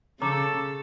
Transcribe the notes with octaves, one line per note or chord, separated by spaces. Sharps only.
C#3 C#4 A4 C#5 A#5 D6